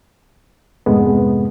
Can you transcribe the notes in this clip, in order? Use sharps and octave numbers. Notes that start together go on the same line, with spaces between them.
F2 G#2 C3 G#3 A3 B3